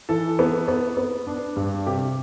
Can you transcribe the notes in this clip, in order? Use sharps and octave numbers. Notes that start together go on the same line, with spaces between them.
E3 A4
B3
B3
B3
D4
G2
C3 G4